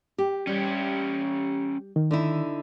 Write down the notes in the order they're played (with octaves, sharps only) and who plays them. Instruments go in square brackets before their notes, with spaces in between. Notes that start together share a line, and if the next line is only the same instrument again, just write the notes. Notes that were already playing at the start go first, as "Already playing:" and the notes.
[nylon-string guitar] G4
[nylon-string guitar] G3 [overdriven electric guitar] C#4 G4
[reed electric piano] D#3
[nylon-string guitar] D3 D#4 E4